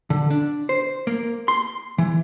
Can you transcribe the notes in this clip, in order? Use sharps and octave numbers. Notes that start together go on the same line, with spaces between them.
D3
D4
C5
A#3
C6
E3